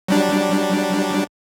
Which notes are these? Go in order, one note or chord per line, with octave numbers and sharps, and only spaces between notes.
F#3 G3 D4